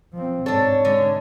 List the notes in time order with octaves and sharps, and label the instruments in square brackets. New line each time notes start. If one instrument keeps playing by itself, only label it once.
[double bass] F3 C4
[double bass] G#2 [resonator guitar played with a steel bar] D4 A4 [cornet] C#5
[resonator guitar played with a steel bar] D3 [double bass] G#3